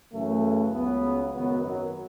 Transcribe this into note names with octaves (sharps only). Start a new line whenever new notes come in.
F#2 C#3 E3 A3
C#2 C#3 F#3 B3
G#1 F#2 D#3 F#3 B3
F#3